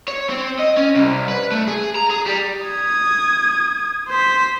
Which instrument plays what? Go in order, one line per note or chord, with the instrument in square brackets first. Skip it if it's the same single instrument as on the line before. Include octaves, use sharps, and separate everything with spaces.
[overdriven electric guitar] C#5
C4
D#5
C#4
C2
B4
A3
G#4
A#5
G#4
G3
[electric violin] D#6 G#6
C5 B6